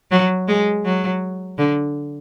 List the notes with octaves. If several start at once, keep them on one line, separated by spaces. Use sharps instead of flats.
F#3
G#3
F#3
D3